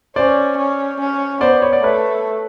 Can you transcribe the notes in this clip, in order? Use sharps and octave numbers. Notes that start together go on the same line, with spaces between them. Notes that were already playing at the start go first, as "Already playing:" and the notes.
C#4 C5 D5
C#4
C#4
B3 C5 D5
C#5
D5
A3 B4 C#5